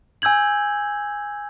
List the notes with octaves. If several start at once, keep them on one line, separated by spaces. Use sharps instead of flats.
G#5 E6 G6 G#6 F#7